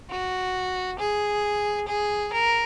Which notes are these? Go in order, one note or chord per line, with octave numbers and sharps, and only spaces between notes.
F#4
G#4
G#4
A#4